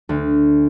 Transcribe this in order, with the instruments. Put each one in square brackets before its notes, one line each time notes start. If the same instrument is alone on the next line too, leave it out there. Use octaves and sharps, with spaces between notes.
[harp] D2